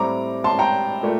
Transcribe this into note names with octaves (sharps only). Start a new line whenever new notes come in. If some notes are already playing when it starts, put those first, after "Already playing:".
Already playing: A2 G3 C4 A#5 D6
A5 C6
G5 A#5
A#2 A3